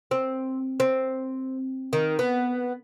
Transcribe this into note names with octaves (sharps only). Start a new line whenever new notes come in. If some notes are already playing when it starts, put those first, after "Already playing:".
C4
C4
D#3
B3